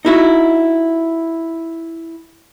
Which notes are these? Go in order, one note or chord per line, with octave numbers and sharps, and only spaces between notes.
D#4 E4 F#4